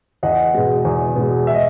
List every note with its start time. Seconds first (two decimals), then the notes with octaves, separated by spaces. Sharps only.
0.23 E2 D#5 F#5
0.54 B2 G#3
0.85 E2
1.16 B2 G#3
1.47 E5
1.54 D#5